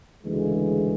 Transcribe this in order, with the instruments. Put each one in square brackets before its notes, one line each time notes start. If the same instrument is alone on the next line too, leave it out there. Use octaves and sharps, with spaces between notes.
[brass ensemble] D2 C#3 E3 G#3